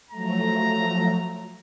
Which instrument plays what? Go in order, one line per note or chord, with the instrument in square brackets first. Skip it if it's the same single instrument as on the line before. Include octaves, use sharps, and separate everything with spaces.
[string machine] F3 F#3 A3 [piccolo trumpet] A#5